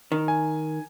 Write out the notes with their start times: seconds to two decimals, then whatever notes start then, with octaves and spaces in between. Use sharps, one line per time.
0.12 D#3
0.28 G#5